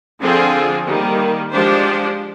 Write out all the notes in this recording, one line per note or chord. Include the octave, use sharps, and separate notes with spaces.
D3 F3 C4 F4 G#4
D#3 G3 A#3
F3 G#3 D4 G4 C5